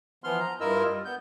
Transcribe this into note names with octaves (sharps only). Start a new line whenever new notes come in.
E3 F3 B3 C6 F6
A#5
G2 E4 F4 A#4 D#5 E6
G3
B3 G6